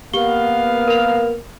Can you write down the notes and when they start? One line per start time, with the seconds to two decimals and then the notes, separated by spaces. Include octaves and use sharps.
0.14 A#3 B3 G4 F5 G7
0.88 A#4 F7